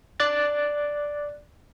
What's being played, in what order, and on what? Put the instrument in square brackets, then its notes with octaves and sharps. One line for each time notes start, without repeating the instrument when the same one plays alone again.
[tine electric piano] D5 F#6 A6